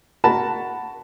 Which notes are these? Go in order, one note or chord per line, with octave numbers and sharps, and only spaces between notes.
F#4 A#4 A5 B5